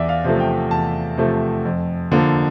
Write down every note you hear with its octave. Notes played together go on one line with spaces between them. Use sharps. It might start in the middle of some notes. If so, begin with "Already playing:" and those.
Already playing: E2 D5 E5
F5
C3 F3 A3
G5
E2 A5
C3 F3 A3
F2
D3 F3 A#3